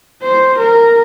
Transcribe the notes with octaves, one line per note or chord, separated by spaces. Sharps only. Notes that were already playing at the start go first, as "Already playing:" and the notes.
C5
A#4